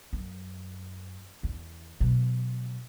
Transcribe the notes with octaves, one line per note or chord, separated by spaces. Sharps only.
F#2
E2
B2 F#3